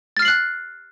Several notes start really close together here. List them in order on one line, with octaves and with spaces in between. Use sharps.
A6 F6 C7 F#7 F#6